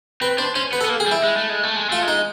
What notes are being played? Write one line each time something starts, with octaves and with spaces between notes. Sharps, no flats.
C4 B4
D4 C5
C#4 C5
B3 B4
A4
B3
A#3
G#4
G3
E4
G#3
A3
G#3
A3
G#3
A3 F4
G#3
D#4